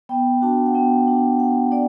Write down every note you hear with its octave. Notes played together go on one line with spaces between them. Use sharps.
B3 G5
D4 F#4 A5
F#5
B3 G5
D4 F#4
B3 F#5
D4 D5